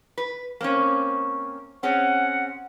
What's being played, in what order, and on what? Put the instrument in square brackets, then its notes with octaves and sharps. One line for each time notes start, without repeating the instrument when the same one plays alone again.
[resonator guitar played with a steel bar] B4
A#3 C4 C#4
[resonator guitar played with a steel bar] C4 C#4 G#4 [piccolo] F#5